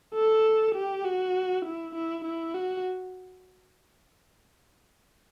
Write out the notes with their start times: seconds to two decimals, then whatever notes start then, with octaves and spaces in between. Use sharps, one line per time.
0.14 A4
0.75 G4
1.05 F#4
1.65 E4
1.95 E4
2.25 E4
2.54 F#4